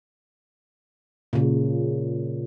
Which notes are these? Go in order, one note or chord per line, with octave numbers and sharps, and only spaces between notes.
A#2 C#3